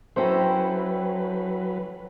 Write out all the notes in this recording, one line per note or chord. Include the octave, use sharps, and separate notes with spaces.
F#3 C#4 E4 A4 B4 C5 G5 A#5